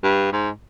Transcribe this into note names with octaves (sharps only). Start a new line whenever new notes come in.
G2
G#2